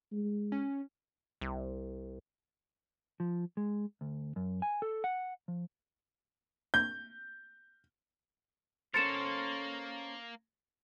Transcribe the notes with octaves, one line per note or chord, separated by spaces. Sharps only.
G#3
C#4
C2
F3
G#3
D2
F#2
G#5
A4
F#5
F3
G6
A#3 C#4 A4 A#4 C5 A6 C#7 E7